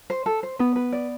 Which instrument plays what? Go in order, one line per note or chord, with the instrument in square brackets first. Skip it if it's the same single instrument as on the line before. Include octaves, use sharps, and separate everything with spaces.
[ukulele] C5
A4
C5
[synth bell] B3 [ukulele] B4
[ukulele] B4
D5